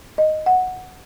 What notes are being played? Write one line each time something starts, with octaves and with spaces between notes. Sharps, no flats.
D#5
F#5